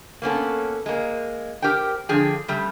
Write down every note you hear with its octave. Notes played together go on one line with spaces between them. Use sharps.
A#3 B3 C#4 A4
G#3 A#3
G4 A#4 C5 G5
D3 F3 G#4 G5
C#3 G3 A3